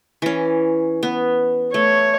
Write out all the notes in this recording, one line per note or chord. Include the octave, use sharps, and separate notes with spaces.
E3 C#4
B3
A3 C#5